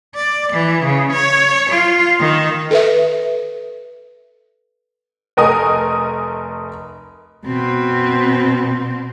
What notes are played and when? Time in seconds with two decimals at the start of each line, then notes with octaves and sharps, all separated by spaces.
0.15 D5
0.53 E3
0.84 C#3
1.13 C#5
1.70 F4
2.19 D#3
2.71 A4 B4 E5
5.37 F1 A3 A#4 D#5 G#5 D#6
7.47 B2 C4